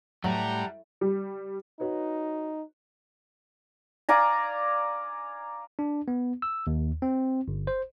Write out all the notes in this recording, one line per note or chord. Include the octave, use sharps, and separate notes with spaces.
A2 F#3 G3 F#5 A5 A#5
G3
D#4 F#4 B4 C#5
D5 F5 G#5 A#5
D4
B3
E6
D#2
C4
G1
C5